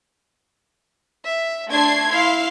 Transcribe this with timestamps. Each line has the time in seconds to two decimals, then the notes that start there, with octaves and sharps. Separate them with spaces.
1.24 E5
1.69 A3 D4 A5 C6 G#6 C7
2.08 E4 F5 C6 C7